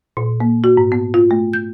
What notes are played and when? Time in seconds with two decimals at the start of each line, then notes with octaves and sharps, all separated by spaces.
0.17 A#2
0.40 A#3
0.64 F#4
0.77 G#2
0.92 B3
1.14 F4
1.31 A3
1.53 G6